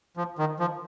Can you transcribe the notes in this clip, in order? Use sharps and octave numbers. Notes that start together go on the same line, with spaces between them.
F3
D#3
F3